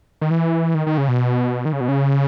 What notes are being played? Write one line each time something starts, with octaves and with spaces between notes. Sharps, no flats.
D#3
E3
D#3
D#3
C#3
B2
D#3
C#3
B2
C#3